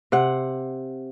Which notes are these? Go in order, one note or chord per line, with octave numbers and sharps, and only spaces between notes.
C3 F#5